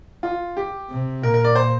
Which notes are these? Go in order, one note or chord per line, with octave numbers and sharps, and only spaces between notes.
F4
G4
C3
A#2 A#4
A#4
D5
C5